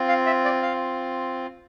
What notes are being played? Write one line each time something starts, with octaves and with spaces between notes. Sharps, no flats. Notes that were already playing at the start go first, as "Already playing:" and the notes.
Already playing: C4 F4
F5
E5
D5
F5